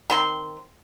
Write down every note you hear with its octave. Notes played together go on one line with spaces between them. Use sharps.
D#3 C4 C6